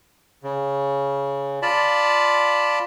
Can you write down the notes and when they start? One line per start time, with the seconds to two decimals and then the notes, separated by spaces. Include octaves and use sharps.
0.43 C#3
1.62 F4 D5 A5 B5